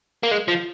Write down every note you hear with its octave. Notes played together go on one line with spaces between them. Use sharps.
A#3
G#3
F3